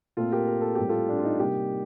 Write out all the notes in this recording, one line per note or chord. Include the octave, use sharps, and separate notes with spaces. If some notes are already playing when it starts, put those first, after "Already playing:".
A#2 A3 C4 F4 A4
G4 A#4
A#4
A4
A2 G3 C4 G4
F4 A4
D4
F4
D#4
C3 G3 A#3 D#4 G4